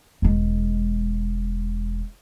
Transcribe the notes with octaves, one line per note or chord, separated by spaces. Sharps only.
E1 G#3